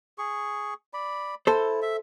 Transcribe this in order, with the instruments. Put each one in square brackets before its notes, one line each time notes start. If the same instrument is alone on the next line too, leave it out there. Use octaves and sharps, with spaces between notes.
[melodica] G#4 C#6
D5 B5
[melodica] E4 [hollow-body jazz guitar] A4 C5
[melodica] E5